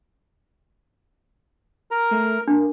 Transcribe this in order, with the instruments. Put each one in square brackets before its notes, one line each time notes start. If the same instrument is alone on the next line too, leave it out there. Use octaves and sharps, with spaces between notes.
[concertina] A#4 A#5
[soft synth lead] A3
[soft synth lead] A#3 [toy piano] D4